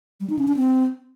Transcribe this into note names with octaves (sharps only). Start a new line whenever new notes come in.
G3
D#4
C#4
D4
C4